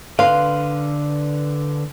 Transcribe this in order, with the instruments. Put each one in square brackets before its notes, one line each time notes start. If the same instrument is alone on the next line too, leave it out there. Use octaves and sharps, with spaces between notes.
[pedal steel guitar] D3 B4 C6 [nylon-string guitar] F5